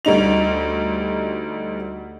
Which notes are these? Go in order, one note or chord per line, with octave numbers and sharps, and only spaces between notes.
D2 G3 D#4 F7